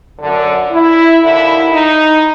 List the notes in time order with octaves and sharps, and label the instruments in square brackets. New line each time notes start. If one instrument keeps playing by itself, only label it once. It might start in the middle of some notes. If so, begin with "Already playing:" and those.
[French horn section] F#2 D3
E4
D#2 D3 E4
D#4